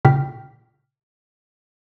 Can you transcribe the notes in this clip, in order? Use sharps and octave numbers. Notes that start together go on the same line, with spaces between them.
A#2 C#3 G5 D6 F6 B6